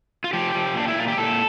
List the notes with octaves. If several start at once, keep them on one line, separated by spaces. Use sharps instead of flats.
F4
F3 G4
F3
A#2 D4
E4
A#2 F4
G4
A#2 A4